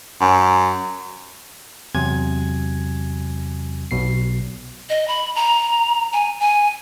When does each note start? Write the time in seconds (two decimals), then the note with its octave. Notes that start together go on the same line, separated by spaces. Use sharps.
0.21 F#2
1.95 E2 C3 F#3 G#5 G#6
3.91 B1 B2 C7
4.89 D#5
5.08 B5
5.36 A#5
6.13 G#5
6.40 G#5